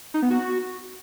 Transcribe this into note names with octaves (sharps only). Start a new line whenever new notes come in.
D#4
B3
F#4